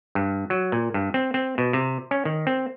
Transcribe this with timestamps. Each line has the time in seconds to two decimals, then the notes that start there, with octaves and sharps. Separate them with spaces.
0.15 G2
0.50 F#3
0.72 A#2
0.94 G2
1.14 C4
1.34 C4
1.58 B2
1.73 C3
2.11 C#4
2.25 D#3
2.47 C4